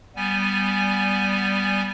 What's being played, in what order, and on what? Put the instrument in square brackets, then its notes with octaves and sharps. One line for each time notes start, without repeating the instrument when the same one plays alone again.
[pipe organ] G3 B3 G#5